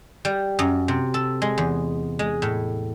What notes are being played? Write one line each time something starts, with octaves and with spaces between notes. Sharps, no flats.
G3
F#2
C3
A4
G#3
E2
G#3
A2